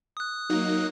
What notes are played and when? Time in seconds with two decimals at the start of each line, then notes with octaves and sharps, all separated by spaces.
0.17 D#6 F#6
0.50 F#3 A#3 D#4